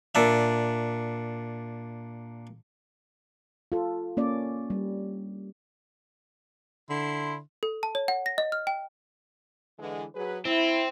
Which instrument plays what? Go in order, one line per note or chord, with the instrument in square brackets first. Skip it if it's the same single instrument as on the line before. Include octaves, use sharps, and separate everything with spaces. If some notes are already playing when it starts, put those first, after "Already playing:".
[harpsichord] A#2 D4 E5
[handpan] F4 A4
A#3 C#4 D5
G3
[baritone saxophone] D3 [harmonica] E4 C6
[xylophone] A4
A5
C#5
F#5
A#6
D#5
F6
G5
[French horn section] D3 E3 G#3
F#3 G#4 B4
[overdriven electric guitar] C4 [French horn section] E4